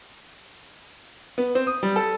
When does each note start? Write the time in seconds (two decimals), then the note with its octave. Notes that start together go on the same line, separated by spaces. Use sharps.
1.38 B3
1.55 C4
1.67 D#6
1.83 G3
1.96 A4